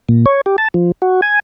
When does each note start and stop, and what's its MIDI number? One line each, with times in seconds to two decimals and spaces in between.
0.09 0.26 46
0.26 0.41 73
0.46 0.56 67
0.58 0.68 81
0.74 0.92 53
1.02 1.21 66
1.22 1.39 80